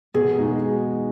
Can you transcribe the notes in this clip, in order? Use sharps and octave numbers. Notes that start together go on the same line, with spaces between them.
B2 G#4
G#3 D#4 F#4